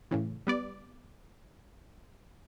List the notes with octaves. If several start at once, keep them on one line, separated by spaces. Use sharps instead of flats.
A2 C#3 E3
G3 B3 D5